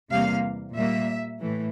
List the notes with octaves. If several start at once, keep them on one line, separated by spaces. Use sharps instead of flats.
E2 C3 G3 A#3 F5
A#2 G3 A#3 E5
A2 E3 A3